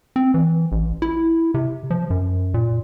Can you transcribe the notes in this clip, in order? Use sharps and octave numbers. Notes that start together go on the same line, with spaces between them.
C4
E3
A1
E4
C3
F3
F#2
A#2